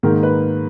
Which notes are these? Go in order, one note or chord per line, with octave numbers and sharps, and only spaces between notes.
G#2 D#3 A#3 A#4
B4